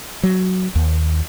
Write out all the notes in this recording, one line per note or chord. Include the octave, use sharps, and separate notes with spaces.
F#3
D#2